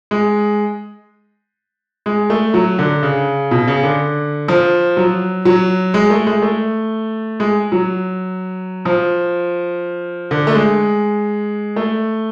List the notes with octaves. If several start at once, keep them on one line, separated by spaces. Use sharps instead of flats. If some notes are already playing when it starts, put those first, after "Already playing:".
G#3
G#3
A3
F#3
D3
C#3
B2
C#3
D3
F3
F#3
F#3
G#3
A3
G#3
A3
G#3
F#3
F3
D3
A3
G#3
A3